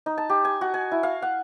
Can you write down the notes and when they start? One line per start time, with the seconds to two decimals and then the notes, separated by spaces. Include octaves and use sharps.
0.06 D#4
0.18 A5
0.29 G4
0.45 G#5
0.61 F#4
0.74 G#5
0.92 E4
1.03 F5
1.22 F#5